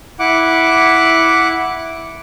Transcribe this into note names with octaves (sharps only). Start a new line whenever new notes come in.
E4 F#5 D6